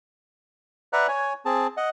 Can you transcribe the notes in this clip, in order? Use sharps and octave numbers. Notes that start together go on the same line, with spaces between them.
B4 D5 E5 F#5 A#5 F#6
C#5 G#5
C4 G#4 A5
D#5 F#5